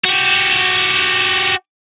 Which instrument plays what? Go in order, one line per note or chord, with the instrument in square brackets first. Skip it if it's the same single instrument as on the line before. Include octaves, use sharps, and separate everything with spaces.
[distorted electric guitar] F#4 G4